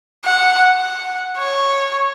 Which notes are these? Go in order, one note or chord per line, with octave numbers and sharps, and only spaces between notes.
F#5
F#5
C#5